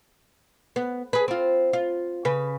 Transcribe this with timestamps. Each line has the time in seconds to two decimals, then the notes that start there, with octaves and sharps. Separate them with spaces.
0.76 B3
1.13 G#4 B4
1.28 C4 F4
1.73 F4
2.25 C#3 B4